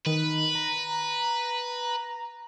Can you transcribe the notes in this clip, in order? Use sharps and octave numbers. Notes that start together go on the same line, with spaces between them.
D#3 B4
A#5